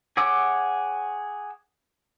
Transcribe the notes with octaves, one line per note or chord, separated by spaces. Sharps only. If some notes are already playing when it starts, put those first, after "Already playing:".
G#4 C#5 F#5 D6 E6